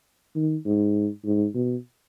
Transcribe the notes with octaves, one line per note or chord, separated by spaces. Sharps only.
D#3
G#2
G#2
B2